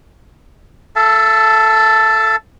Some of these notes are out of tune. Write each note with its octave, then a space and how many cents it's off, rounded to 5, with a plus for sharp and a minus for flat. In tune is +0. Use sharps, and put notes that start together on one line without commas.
A4 +0 E5 +40 A5 +0